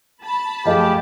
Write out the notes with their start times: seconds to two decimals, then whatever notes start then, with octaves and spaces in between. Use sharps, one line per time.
0.23 A5 B5
0.66 F#2 F3 A3 G4 G#4 D#5 F5